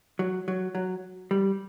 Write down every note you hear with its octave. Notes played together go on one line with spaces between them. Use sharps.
F#3
F#3
F#3
G3